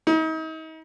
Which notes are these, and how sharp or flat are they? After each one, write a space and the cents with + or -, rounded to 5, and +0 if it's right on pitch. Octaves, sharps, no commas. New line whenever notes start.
D#4 +40